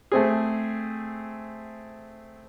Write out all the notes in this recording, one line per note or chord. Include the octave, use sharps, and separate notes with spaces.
A3 C4 G#4